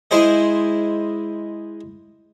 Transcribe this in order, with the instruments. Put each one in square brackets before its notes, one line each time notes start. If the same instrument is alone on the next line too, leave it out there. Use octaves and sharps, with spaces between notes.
[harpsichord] G#3 E4 G#4 C5 D#5